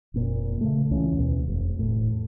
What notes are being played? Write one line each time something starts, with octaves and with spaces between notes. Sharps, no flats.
F1 A#2
C#3 A3
C#2 E3 C#4
D#2 B2
F1
E1 A2